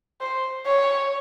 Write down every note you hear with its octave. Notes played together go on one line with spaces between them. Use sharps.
C5
C#5